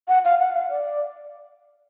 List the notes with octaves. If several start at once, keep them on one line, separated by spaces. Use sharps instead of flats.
F#5
F5
F#5
F5
D5